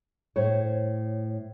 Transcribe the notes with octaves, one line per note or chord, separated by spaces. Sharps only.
A2 C5 C#5